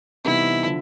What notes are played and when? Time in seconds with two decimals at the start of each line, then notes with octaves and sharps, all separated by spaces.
0.24 C3 E3 G3 B3 D#4 E4
0.65 D3 F3